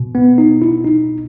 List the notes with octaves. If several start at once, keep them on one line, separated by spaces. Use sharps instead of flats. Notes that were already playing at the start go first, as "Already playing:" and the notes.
Already playing: B2
B3
D#4
E4
D#4